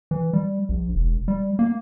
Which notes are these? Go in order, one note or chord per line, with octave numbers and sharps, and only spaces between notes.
E3
G3
A#1
E1
G3
A#3